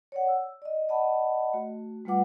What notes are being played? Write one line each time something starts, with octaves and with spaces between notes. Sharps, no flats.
C#5 D5 F#5
E6
D5 D#5
D5 D#5 F#5 A5 B5
A3 F#4
G3 A3 F4 B4 F#5 D6